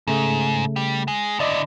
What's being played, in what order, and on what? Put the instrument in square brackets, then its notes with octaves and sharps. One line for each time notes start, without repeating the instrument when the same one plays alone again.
[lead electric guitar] G#2 [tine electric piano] C#3 A3
[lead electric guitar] G3
G#3
[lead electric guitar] D3 E4 [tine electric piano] D5 D#5